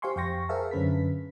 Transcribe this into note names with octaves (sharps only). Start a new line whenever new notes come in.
G4 C5 F5 G#5 C6 C#6
F2 F5 G5 C#6 A#6
G#4 A#4 C5 E5 F5 A5
F#2 D3 C#4 B4 B6